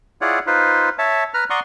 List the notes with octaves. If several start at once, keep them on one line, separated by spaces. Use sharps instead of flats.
E4 F4 G#4 C#5 D5 F#5
D#4 F4 B4 C5
C#5 E5 A5
B4 A#5 F6
D5 F#5 A#5 C6 C#6 D#6